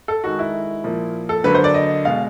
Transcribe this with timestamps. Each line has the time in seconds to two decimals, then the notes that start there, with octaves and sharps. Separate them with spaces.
0.08 A4
0.24 D#3 G#3 F#4
0.39 E4
0.84 A#2 F3 A#3
1.29 A4
1.44 D3 F#3 A#3 B4
1.54 C5
1.64 D5
1.74 D#5
2.05 B2 G#3 F5